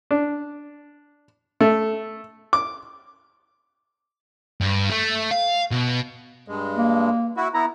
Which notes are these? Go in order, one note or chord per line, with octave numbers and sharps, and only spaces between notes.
D4
A3
D6
G2
A3
F5
B2
G2 G#3
A#3
E4 F#4
B3 E4 A#5